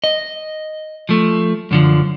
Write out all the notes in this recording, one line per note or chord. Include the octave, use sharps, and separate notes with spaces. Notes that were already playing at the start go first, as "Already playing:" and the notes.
D#5
F3 A3
F#2 D3 F3